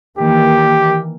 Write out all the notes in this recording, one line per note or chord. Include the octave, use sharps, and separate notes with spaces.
D#3 E3 A#3 G4